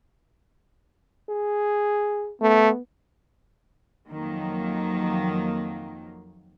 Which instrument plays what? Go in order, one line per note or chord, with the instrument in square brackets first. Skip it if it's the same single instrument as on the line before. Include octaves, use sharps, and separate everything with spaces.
[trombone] G#4
[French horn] A3 [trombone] B3
[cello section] F2 D#3 F#3 A#3